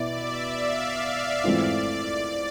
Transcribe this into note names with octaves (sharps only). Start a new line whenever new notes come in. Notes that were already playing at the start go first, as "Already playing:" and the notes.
Already playing: B2 B3 E4 D5
E5
F5
E5
G#2 E3 A3 C4 F4 D5